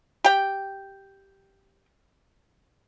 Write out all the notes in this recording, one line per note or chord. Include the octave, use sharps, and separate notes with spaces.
G4 G5